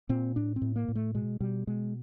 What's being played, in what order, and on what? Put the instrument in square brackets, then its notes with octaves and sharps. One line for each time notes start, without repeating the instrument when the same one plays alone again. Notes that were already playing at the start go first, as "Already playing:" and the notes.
[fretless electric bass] A#2 C4
A2 D4
C4
A2
A#3
A2
A3
B2 G#3
B2 G3
B2 G#3